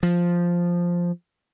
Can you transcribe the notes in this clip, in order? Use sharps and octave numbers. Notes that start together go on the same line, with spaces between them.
F3